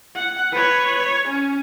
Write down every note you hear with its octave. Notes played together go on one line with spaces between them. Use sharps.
F#5
B4 C#5
C#5
C#4